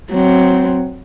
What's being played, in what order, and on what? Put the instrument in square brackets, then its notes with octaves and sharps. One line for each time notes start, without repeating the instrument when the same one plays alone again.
[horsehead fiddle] F#3 C4